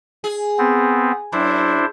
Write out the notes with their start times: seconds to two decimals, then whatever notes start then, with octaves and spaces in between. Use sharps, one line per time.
0.24 G#4
0.58 B3 C4
1.33 F#2 D4 E4 C5